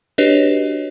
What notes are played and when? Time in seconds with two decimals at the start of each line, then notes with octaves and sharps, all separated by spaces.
0.18 D4 F#4 G4 B4 C#5 D#5